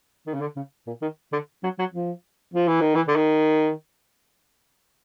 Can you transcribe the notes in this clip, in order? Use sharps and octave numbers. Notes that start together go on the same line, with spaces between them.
D#3
C#3
D3
C#3
A#2
D#3
D3
F#3
F#3
F3
F3
E3
D#3
E3
D3
D#3